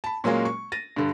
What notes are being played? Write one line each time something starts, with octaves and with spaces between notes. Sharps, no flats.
A5 B5
A#2 F#3 G#3 A#3 C#4
C#6
A6 A#6 D#7
G2 D3